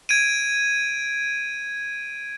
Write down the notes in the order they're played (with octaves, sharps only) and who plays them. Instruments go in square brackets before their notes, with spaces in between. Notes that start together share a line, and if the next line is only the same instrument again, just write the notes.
[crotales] G#6 D7 D#7